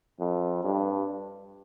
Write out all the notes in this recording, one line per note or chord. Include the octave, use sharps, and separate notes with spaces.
F2
G2